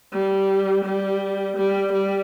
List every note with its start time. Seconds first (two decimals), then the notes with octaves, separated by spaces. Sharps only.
0.13 G3
0.85 G3
1.57 G3
1.93 G3